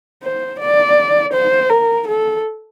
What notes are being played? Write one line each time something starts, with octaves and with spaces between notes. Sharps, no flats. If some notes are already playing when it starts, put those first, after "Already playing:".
C5
D5
C5
A#4
A4